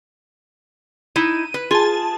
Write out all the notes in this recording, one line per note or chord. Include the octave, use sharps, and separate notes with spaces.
D#4 E4 D#7
B4
F4 G#4 A5